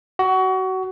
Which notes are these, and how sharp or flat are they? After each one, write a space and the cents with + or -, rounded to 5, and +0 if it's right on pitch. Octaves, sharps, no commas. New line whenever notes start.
F#4 +25